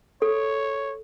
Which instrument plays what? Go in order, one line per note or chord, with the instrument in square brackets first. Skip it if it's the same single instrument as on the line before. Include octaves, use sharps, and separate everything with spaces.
[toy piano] A4 [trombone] C#5